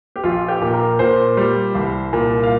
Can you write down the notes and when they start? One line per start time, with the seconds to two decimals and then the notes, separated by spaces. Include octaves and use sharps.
0.16 G4
0.23 A#1 F4
0.48 G4
0.61 A#2
0.73 A#4
0.99 A#2 C5
1.37 G3
1.75 C2
2.13 A#2
2.43 F5